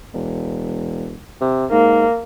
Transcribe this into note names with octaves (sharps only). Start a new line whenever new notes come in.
E1
C3
G#2 A#3